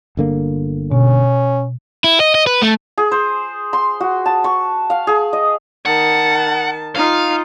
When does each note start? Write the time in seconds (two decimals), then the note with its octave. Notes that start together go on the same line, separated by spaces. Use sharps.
0.17 G1 D3 A#3
0.92 B2 C#4
2.04 E4
2.20 D#5
2.35 D#5
2.47 B4
2.62 A3
2.98 G#4
3.12 C5
3.73 C6
4.00 F#4
4.26 A5
4.44 C#6
4.90 F5
5.07 G#4
5.33 D#5
5.86 D#3 F#5 A5
6.95 D#4 F4 F5